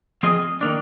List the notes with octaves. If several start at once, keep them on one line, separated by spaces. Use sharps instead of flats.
F3 C4 F4 G#4 D#5
D#3 A#3 D4